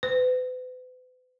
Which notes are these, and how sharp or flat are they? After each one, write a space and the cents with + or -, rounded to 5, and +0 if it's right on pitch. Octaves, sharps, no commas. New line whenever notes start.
B4 +40